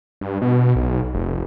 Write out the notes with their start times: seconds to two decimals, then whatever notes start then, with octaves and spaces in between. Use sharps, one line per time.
0.21 G2
0.42 B2
0.76 B1
1.14 F1